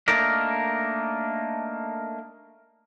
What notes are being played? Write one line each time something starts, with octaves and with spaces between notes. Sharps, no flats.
A3 A#3 D4 D#4 A#4